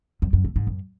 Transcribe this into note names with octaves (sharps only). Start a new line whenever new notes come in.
F#2
F#2
A2
G#2
F#2